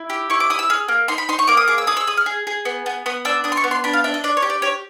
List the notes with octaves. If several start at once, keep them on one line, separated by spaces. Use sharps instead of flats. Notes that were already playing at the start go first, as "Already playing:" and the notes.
Already playing: E4
G4
E4 C#6
D6
E4 D#6
E6
G#4 F6
A#3
D#4 C6
B5
D#4 C6
C#6
A#3 D6
D#6
G#4 D6
E6
G#4 D#6
E6
G#4 D#6
F6
G#4
G#4
B3
B3
B3 D#6
D4 E6
D4 D#6
C6
C#6
B3
C6
D4 B5
F5
D4 E5
D#5
D4 D5
C#5
G4
D5
G4 C#5